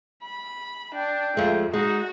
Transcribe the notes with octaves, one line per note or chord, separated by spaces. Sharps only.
B5
D4 G5
F2 G#3 A3
G#3 D#4 F#4